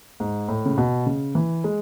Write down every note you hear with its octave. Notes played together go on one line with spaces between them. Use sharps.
G#2
A2
C#3
B2
C#3
E3
G#3